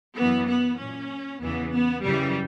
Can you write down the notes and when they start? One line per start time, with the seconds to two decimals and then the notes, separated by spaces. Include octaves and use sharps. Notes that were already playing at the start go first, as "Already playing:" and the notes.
0.17 F#2 E3 B3
0.49 B3
0.80 A#2 C#4
1.41 E2 C#3 E3 B3
1.72 B3
2.03 F#2 C#3 E3 G3